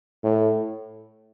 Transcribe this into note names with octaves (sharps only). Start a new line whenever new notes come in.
A2